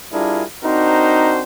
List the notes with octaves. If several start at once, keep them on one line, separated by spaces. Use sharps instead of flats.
G3 D4 E4 F4 G#4 A#4
C4 D4 D#4 F#4 A#4 C5